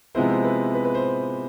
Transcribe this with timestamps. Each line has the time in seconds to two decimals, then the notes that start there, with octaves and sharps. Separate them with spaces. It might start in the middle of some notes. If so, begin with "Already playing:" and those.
0.15 C3 F3 G#3 B3 E4 C5
0.30 C5
0.45 B4
0.74 B4
0.85 B4
0.95 C5